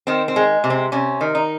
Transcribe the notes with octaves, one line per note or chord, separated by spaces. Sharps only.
D#3 C4
C4
G#3
C3
C4
C3 C#4
D#3
D#4